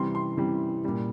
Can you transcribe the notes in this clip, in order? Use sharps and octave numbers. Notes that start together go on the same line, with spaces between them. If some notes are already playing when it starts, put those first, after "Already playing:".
Already playing: C3 E3 G3 C6
C6
C3 E3 G3
A#2 G3